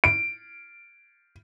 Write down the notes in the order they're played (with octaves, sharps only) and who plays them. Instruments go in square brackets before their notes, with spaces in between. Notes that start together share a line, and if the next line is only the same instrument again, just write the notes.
[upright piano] D7